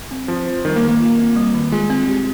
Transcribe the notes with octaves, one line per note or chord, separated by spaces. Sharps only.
C4
F3 C4
C5
D#3 G3
A#3
D#3
A#3
F4
C4
G3
D#3
G#3 F4
C4
G4